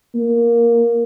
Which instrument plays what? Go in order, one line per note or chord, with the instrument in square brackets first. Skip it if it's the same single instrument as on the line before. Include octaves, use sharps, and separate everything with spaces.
[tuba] A#3